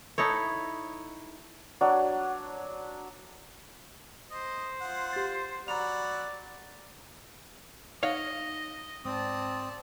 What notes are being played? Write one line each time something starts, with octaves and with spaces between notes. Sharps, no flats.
D#4 E4 A4 C#5
F#3 D4
C5 D#5
F4 F#5
G4 A6
F#3 D5 F#5 A#5 B5 F7
D#4 C#5 D#5 F5 F#5
G#2 C4 D5 A5 D#6